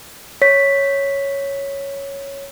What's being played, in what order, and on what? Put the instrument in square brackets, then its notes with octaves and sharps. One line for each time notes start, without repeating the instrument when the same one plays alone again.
[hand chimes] C#5 B6